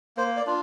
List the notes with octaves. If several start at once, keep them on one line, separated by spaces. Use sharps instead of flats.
A#3 C5
D5
D4 F4